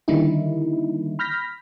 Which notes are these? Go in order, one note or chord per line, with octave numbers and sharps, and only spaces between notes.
D3 D#3 G3 A#3 D#4 E4
B5 F6 G6 A#6 B6